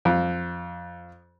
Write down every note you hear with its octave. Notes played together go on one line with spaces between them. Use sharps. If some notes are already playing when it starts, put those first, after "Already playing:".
F2